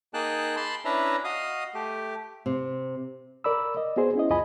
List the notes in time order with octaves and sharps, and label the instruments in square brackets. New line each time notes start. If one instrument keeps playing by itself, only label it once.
[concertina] A#3 D#4 G#4 G5 A5 F#6
A5 B5 C6
C#4 D4 E4 B4 E5 A#5
F#4 D#5 F5 D#6
A3 G4
[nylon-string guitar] C3
[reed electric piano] A#4 D5 B5 E6
D5 D#5
B3 F#4 G#4 C5
C#4 E4 D#5
C#2 F#2 F4 D#5 G#5 B5